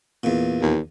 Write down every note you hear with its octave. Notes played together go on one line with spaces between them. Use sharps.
E2 A#2
D#2